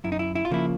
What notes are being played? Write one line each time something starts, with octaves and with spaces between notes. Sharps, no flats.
F#2 E4
D#4
E4
E4
F4
C#3 F3 A#3 E4